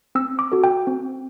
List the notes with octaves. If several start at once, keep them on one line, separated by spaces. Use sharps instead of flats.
C4 E6
D6
F#4 A4
G5
C4